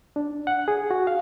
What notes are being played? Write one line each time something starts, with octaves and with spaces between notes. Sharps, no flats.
D4
F#5
G#4
F#4
F5